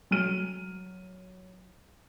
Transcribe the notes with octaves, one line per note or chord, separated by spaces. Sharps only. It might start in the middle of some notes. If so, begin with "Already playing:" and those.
F#3 F6 D#7